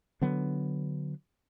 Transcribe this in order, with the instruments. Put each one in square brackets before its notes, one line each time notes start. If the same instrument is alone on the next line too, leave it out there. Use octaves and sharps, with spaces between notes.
[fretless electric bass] D3 F#3 B3 D4